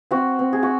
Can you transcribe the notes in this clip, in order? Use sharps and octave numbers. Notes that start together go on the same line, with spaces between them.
C4 F#4
C4
G#4
F#4